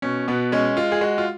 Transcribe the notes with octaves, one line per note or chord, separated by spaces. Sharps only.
B2 C#4
B2 B3
G#3 C#4
G#3 F4
G#4
G#3 F#4
F4